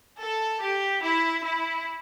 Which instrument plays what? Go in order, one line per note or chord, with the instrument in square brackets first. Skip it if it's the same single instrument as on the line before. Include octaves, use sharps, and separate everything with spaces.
[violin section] A4
G4
E4
E4